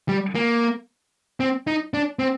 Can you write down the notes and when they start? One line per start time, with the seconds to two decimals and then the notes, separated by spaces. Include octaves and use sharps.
0.09 G3
0.35 A#3
1.40 C4
1.67 D#4
1.94 D4
2.19 C4